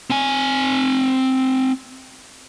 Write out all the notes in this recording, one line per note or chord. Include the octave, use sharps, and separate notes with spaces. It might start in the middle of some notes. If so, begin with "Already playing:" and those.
C4 G#5